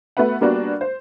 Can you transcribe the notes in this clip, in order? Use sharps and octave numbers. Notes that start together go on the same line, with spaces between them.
A3 B3 F#4 B4 F#5
G3 A#3 B3 D4 F#4
C5